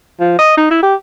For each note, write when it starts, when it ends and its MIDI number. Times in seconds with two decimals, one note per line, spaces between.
0.20 0.38 53
0.39 0.52 75
0.58 0.69 63
0.71 0.82 64
0.83 0.94 67